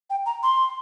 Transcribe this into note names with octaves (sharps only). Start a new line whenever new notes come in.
G5
A#5
C6